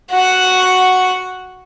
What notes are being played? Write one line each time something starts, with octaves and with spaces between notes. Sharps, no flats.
F#4 F#5